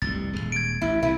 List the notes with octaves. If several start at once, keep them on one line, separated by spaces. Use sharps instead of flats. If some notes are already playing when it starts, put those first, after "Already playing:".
F1 C2 G2 A6
D#1 C2 G#3
G#6 D7
A1 D2 E4
C2 C3 E4